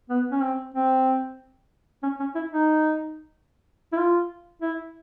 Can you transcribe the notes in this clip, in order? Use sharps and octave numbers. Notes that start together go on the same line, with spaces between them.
B3
C#4
C4
C4
C#4
C#4
E4
D#4
E4
F4
E4